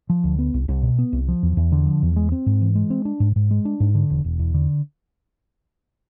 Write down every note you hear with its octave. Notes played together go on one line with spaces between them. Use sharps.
F3
D2
B3
C2
C2
B2
B3
C2
F3
E2
E2
D3
F3
E2
G#3
C4
G#2
E3
G#3
C4
D4
G#2
G#2
G#3
D4
G#2
D3
E1
E1
E2
D3